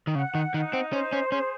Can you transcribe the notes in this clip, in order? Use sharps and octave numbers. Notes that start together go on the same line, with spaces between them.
D#3
C#3 F#5
D#3
D#3 D#4
C4
C#4 C5
C#4
C#4 G#4